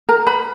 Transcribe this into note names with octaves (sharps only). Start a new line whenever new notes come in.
A#4 A#5
B4 B5